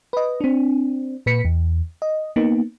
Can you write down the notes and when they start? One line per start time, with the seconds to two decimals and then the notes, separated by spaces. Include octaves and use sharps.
0.13 B4 D#5
0.41 C4 D4
1.26 A#2 B4 B6 C#7
1.45 E2
2.02 D#5
2.36 A#3 B3 D#4